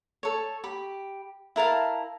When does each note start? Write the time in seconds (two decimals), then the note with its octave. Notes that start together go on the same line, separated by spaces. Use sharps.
0.23 A4 C#5
0.64 G4 B5
1.56 E4 A#4 F5 A5